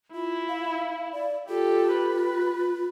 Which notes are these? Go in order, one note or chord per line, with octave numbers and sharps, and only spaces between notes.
E4 F4
F5
D5
F4 G4 A4
B4